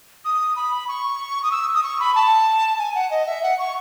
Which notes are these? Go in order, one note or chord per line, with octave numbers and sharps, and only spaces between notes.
D#6
B5
C#6
D#6
E6
D#6
C#6
B5
A5
G#5
F#5
D#5
E5
F#5
C#6